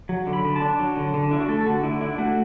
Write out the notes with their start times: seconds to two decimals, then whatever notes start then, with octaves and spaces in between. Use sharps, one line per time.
0.09 F#3
0.27 D3
0.33 B5
0.45 D3
0.56 A5
0.62 D4
0.79 F#3
0.97 D3
1.14 D3
1.31 D4 E4
1.40 F#4
1.48 A3 A4
1.61 A4
1.66 D3 F#4
1.83 D3 E4
2.01 D4 E4
2.18 A3 F#4